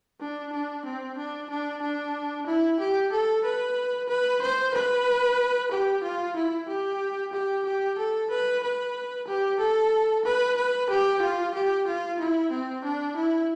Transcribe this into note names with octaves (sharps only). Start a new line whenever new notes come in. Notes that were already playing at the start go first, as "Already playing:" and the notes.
D4
D4
C4
D4
D4
D4
E4
G4
A4
B4
B4
C5
B4
G4
F4
E4
G4
G4
G4
A4
B4
B4
G4
A4
B4
B4
G4
F4
G4
F4
E4
C4
D4
E4